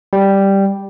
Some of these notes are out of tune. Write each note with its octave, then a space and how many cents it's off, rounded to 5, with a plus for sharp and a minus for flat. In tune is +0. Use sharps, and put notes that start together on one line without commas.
G3 +0 G5 +0